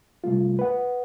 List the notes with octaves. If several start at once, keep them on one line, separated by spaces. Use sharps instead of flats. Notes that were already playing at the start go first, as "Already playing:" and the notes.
C3 G3 A3 F4
B4 F#5